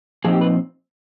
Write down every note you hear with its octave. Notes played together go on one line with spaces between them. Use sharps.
A#2 F3 C4 D#4 G#4
G4
B4